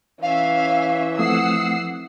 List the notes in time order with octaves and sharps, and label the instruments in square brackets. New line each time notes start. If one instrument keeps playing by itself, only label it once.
[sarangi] E3 [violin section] C#4 E5 [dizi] F5
[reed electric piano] F3 A3 C4 [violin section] F#5 E6 C7 [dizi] D#6